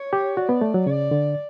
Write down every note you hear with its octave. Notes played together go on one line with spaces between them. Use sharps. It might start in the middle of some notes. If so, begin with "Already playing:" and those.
Already playing: C#5
G4
F#4 D5
B3
A3
F#3
C#3 D5
D3